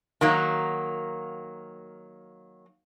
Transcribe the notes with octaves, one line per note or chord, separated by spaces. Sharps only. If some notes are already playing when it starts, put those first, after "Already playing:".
D#3 F#3 A#3